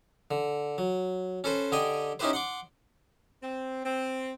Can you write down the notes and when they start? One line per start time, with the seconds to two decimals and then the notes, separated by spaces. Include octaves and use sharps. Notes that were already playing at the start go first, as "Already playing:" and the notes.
0.31 D3
0.78 F#3
1.44 C#4 A4 B4 C5
1.72 D3 G4 D#5 G5 G#5
2.19 C#4 D#4 E4 G4 B4 C5
2.33 F#5 C6 D6
3.43 C4
3.85 C4